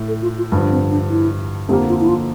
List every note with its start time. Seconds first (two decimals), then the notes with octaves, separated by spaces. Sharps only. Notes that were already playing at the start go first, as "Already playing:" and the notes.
Already playing: A2
0.08 A4
0.22 F4
0.38 F4
0.52 G2 D3 F3 D4
0.71 C4
0.91 D4
1.10 E4
1.69 F2 D3 F3 A#3 G4
1.89 F4
2.00 E4
2.08 F4